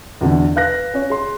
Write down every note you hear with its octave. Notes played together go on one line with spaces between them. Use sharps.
E2 B2 D3
B4 F5 F#6 A#6
C#4 C#5
G#4 C6